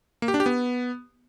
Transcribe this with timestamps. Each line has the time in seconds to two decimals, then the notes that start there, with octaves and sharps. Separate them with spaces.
0.22 A#3
0.28 G4
0.34 D4
0.40 G4
0.46 B3